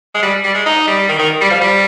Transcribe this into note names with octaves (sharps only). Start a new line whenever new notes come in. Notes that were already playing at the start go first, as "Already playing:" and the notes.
G#3
G3
G3
G#3
D#4
G3
D#3
D#3
G3
F3
G3